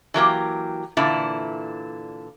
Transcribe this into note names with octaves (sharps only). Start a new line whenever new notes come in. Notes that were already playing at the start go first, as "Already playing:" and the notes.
E3 F#3 A#3 G4
A#2 D3 E3 E4